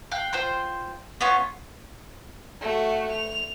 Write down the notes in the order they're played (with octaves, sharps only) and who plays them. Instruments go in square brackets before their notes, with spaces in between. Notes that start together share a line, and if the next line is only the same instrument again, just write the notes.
[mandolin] F5 G5 F#6
F4 C5 G5 C6
B3 C#4 F4 C#6
[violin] A3 F#4
F7